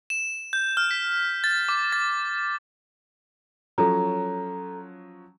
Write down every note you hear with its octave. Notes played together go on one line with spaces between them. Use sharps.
E7
G6
F6
B6
A6
D6
A6
F3 F#3 C#4 A4 A#5